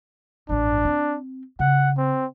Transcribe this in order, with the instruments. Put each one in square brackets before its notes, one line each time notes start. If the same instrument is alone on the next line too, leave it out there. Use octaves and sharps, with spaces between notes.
[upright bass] A1 G2 [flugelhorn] D4
[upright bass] C4
[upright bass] C#3 [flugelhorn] F#5
[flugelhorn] C4